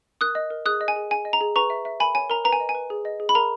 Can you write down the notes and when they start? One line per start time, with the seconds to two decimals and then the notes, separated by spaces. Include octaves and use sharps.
0.21 A#4 D#6 F#6
0.35 D#5
0.51 A#4
0.66 G#4 D#6 F#6
0.81 D#5
0.88 G#5
0.96 G#4
1.10 G#4 G#5
1.25 D#5
1.33 A#5
1.41 G#4
1.56 B4 A#5 C#6
1.70 E5
1.85 E5
2.00 A#4 G#5 B5
2.15 C#5 G#5
2.30 A#4 A#5
2.45 B4 A#5
2.53 G#5
2.60 D#5
2.69 G#5
2.75 B4
2.90 G#4
3.05 D#5
3.20 G#4
3.29 B5
3.35 A#4 A#5